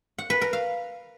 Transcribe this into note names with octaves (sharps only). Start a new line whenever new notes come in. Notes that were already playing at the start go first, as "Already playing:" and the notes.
F#5
B4
A#4
F5